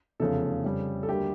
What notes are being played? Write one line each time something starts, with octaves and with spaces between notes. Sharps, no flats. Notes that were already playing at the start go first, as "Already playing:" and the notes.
F1 E2 C#3 F3 A3 A4
F2 C#3 G3
A4
D2 D3 G3 A#3 G4